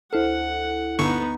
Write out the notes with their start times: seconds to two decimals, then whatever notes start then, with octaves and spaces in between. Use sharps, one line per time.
0.13 D2 E4 A4 C5 F#5 F6
0.99 G1 D3 B3 D#4 C#6